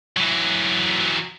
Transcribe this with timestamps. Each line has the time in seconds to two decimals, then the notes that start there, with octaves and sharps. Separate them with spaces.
0.17 E3 F#3